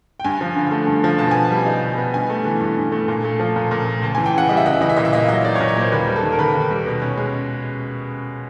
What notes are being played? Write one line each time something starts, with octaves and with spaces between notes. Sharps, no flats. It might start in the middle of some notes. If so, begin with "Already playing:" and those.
G5
G2 G#5
F3
D3
A3
G2
F3
B2 A5
B3 G#5
A5
G3
D#4
B2
B3
G2 G#5
A3
E3
G2
G2
A3
A#2
A3
F3
A#2
A#2
A3
C#2 A5
E3 G#5
G5
C#3 F#5
G3 D#5
E5
C#2 D#5
E5
E3 D#5
E5
A#2 D#5
E5
A#3 D#5
E5
F#3 D#5
D#4 D5
C#5
A#2
C#5
A#3 C5
D#2 B4
G3
A4
D#3
A#4
D#2 B4
D#2
G3
B2
C#4
G#3